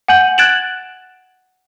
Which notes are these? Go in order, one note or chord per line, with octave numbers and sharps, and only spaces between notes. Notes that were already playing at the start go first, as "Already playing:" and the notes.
F#5 G#5 G6 F#7
F#6 G#6 A6 D7 E7 F#7